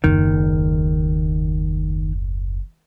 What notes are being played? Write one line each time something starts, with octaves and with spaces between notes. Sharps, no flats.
F#1 D#2 D#3